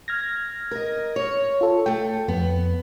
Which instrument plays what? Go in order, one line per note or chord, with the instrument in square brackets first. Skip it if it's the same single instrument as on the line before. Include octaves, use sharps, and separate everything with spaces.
[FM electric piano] F6 G#6 A#6
[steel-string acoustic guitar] A#4 D#5
C#5
[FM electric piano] F4 A4
[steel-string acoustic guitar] A3 A4 [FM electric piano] G5
[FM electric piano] F2 [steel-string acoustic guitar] B3